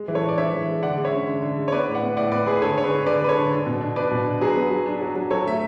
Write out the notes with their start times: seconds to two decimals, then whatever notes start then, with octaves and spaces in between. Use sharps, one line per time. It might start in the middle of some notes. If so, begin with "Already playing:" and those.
Already playing: G#3
0.08 E3
0.15 A4 C#5
0.23 E3
0.29 D5
0.38 D4 C#5 E5
0.53 E3
0.68 G#3
0.82 D3 D5 F#5
0.97 G#3
1.05 C#5 E5
1.13 C#4
1.27 D3
1.42 D3
1.58 G#3
1.68 C#5
1.72 B3 B4 D5
1.87 A2
1.94 D5 F#5
2.02 B3
2.17 A2 D5 F#5
2.32 B3 B4 D5
2.46 G#3 G#4 B4
2.62 D3 A4 C#5
2.77 D3 C#5
2.84 G#4 B4
2.92 D3
3.06 D3 B4 D5
3.21 G#3 B4
3.29 A4 C#5
3.36 D3
3.52 D4
3.67 B2
3.81 D4
3.96 D4 B4 D5
4.11 B2
4.27 D4
4.41 F#3 G#4 B4
4.56 B3
4.71 F#3
4.86 D4
5.02 F#3
5.16 F#3
5.31 F#3 A4 C#5
5.46 A3 E5